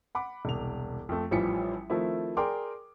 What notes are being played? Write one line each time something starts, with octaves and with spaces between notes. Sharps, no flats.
F#5 B5 D6
E1 C2 F7
F2 A3
A1 E3 F3 G3 B6 C#7
D#3 F3 A3 C4 E4
G#4 A#4 D5 G5 C6 D6